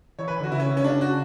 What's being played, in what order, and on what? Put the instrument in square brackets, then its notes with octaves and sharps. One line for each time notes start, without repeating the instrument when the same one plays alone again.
[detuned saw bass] E3 [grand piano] C#5
[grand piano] B4
[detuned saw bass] E3
[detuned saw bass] D3 [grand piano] F#4
[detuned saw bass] C#3 [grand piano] E4
[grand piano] C#4
C#4
D4
F#4